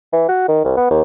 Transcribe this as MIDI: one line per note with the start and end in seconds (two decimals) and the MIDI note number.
0.13 0.24 52
0.29 0.46 66
0.48 0.60 51
0.65 0.77 36
0.77 0.91 59
0.91 1.02 39